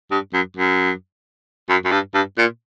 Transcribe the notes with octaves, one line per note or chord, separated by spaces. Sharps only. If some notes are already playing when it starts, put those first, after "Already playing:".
G2
F#2
F#2
F#2
F#2
G2
G2
A#2